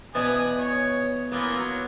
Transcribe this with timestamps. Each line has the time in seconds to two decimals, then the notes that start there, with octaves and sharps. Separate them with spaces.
0.15 B2 E3 B3 D5 G#5 D#6
0.58 C#5
1.32 E3 A#3 B3 F4
1.57 F#3